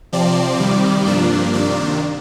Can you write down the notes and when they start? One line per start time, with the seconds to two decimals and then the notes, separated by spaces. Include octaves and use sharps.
0.12 C3 F3 C4 D5
0.59 C3 D#3 G3
1.06 G2 F3 A#3 D4
1.53 C3 D#3 A#3 D4 D5